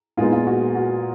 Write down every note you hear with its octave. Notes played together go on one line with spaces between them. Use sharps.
A#2 G#3 B3 D#4 F4
F4
F#4
F#4